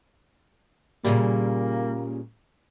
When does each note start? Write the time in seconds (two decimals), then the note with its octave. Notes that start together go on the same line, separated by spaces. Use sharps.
1.05 A#2 C#3 G3 A#3